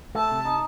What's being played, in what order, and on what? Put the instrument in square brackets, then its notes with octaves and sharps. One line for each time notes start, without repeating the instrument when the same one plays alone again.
[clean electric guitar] A3 [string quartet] A5
[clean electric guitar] C3
D#4